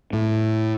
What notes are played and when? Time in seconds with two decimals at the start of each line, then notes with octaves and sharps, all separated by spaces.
0.13 A2